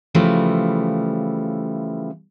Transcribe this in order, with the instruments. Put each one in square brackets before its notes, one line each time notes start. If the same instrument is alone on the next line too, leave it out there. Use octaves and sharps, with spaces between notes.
[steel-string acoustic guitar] C#3 E3 F3 G3 A3